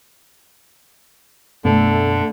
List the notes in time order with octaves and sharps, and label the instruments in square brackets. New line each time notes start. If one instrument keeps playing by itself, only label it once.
[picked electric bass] F#2 B2 B3 [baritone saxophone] D3 [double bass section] A3